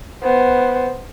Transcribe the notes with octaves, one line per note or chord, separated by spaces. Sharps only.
B3 C5